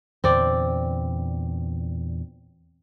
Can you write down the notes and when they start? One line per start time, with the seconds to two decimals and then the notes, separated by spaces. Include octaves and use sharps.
0.24 E2 A#2 D3 C4 D5